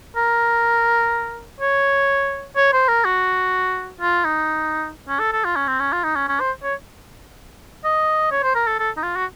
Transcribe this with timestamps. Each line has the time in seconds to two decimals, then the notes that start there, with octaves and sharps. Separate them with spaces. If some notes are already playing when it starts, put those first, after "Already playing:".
0.16 A#4
1.60 C#5
2.56 C#5
2.73 C5
2.88 A#4
3.05 F#4
4.01 F4
4.25 D#4
5.08 C#4
5.20 A4
5.33 A4
5.45 F4
5.56 C#4
5.68 C4
5.80 C#4
5.93 F4
6.04 D#4
6.16 C#4
6.28 C#4
6.40 C5
6.63 C#5
7.84 D#5
8.32 C#5
8.43 C5
8.55 A#4
8.67 A4
8.79 A4
8.97 D#4
9.03 F4
9.16 F#4